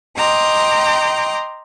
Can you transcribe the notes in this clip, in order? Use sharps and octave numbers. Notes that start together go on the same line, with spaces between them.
D#5 G5 A#5 C6 D6